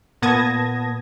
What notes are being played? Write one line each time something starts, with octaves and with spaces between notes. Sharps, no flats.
A#2 B3 A5 D#6 G#6 A#6